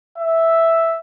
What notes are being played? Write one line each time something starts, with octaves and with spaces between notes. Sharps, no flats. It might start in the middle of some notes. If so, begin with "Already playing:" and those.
E5